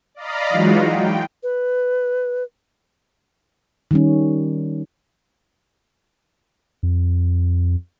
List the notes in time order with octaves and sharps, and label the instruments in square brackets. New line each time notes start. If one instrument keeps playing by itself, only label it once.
[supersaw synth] D5 D#5 F5 A#5 B5
E3 F#3 G#3 D#4 F4 F#4
G5
[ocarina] B4
[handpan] D#3 G3 C#4
[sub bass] F2